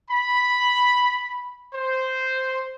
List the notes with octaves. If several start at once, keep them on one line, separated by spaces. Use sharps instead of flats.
B5
C5